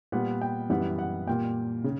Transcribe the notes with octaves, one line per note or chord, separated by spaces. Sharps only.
A#2 G3 B3 F#5
G5
F#2 E3 G3 B3 F#5
F#5
A#2 G3 A#3 G5
C#3